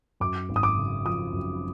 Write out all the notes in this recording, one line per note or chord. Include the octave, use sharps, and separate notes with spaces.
F#2 D6
G#1
D#6
D6
C#3
F3 D#6
F#2